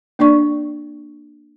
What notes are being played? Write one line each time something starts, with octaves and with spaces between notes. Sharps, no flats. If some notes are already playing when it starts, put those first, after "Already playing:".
A#3 D4 D5 C#6